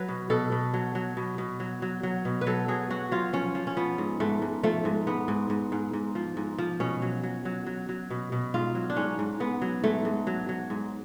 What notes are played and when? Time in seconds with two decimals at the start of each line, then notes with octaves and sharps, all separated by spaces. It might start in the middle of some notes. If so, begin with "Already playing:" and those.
Already playing: F#3 B4
0.08 B2
0.30 B2 A4
0.52 B2
0.74 F#3
0.95 F#3
1.17 B2
1.38 B2
1.60 F#3
1.82 F#3
2.03 F#3
2.25 B2
2.41 B4
2.46 F#3 A4
2.68 F#3 G#4
2.90 F#3 F#4
3.11 F#3 F4
3.33 F3 C#4
3.55 F3
3.67 C#4
3.77 F3 B3
3.98 G#2
4.20 G#2 A3
4.42 G#2
4.63 F3 A3
4.85 G#2
5.07 G#2 B3
5.28 G#2
5.50 G#2
5.72 G#2
5.93 G#2
6.15 F3
6.37 G#2
6.58 F3
6.80 B2 C#4
7.02 F#3
7.23 F#3
7.45 F#3
7.67 F#3
7.89 F#3
8.10 B2
8.32 B2
8.54 G#2 F4
8.75 F#3
8.90 D4
8.96 G#2 C#4
9.19 G#2
9.40 G#2 B3
9.62 F#3
9.84 G#2 A3
10.05 G#2
10.27 F#3
10.49 F#3
10.70 G#2